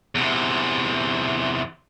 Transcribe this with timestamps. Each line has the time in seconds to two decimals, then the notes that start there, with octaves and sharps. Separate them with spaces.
0.15 E2 C3